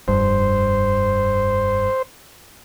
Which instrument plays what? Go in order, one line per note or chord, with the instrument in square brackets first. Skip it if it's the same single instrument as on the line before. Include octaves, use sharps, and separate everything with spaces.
[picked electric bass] F1 G2 [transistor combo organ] C5